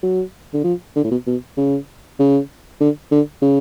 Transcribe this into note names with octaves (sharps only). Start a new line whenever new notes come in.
F#3
D3
F3
D3
A2
B2
B2
C#3
C#3
D3
D3
C#3